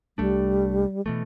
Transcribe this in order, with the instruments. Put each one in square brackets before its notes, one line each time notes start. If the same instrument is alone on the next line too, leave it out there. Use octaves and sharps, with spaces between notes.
[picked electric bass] C2 A3 D4 [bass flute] G3
[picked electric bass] B2 E3 A3